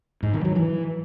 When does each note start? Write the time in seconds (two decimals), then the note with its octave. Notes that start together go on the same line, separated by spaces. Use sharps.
0.23 G#2
0.34 D#3
0.45 F#3
0.55 E3